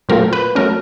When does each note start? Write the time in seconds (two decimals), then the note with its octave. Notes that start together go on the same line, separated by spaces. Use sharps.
0.09 A#2 F#3 A3 C4 F4 A#4
0.33 B4
0.55 F#3 A3 C#4 A#4